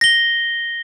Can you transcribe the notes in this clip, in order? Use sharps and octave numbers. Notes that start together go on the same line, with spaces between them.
A#6 G7